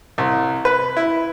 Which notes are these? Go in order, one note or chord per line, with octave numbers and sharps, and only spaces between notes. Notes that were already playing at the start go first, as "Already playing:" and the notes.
C2
B4
E4